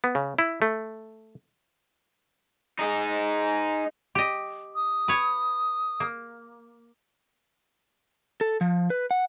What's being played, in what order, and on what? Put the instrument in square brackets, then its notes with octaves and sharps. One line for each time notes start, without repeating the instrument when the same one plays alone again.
[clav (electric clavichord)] B3
C#3
E4
A3
[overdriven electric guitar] D#4 G#4
[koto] G4 D#5
[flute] D#6
[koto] B4 C#5
A#3
[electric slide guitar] A4
F3
B4
F#5